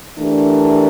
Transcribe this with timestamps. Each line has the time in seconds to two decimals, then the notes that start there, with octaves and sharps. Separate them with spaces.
0.16 E3 A3 D4 G4 A#4